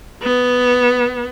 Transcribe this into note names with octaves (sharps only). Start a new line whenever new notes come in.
B3